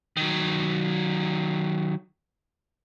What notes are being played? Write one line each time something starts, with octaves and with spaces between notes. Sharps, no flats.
D#3 F#3